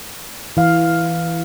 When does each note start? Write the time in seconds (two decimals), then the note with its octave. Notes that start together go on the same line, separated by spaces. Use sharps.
0.57 E3 F5